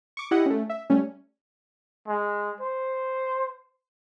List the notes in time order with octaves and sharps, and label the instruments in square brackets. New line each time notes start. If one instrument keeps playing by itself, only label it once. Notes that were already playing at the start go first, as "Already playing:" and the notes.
[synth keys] C#6 D6
E4 G4 D#5 F#5
A3 C#4
E5
G3 A3 C#4
[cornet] G#3
C5